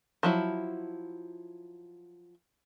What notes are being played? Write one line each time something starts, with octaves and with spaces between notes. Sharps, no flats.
F3 F#3 E4